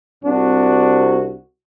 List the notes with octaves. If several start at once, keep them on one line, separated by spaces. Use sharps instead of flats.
C2 C3 D4 F#4